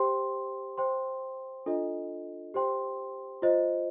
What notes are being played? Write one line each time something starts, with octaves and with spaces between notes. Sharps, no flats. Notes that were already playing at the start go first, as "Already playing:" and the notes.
Already playing: G4 C5 G5 C6
C5 G5 C6
D4 F4 A4 D#5
G4 C5 G5 C6
F4 C5 D#5